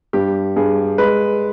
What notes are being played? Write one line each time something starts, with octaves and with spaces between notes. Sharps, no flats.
G2 G4
G2 G#4
G#3 B4